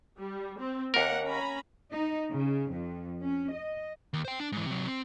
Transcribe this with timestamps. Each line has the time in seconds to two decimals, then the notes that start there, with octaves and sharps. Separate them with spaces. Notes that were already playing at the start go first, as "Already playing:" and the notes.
0.20 G3
0.59 C4
0.94 D#2 A#3 A#4 F#5
1.26 C#4 A#5 B5
1.92 D#4
2.29 C#3
2.72 F2
3.22 C#4
3.53 D#5
4.13 D#2
4.25 C5 G5
4.40 D4
4.52 G#2 E3
4.66 C3 F#3
4.87 C4